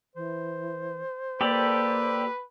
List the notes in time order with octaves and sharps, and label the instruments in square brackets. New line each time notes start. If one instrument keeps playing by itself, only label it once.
[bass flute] E3 [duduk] C5
[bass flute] A#3 [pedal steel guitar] G4 A4 D5 [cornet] B4